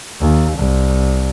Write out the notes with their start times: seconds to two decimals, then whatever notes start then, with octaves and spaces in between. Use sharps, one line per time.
0.20 D#2
0.57 C2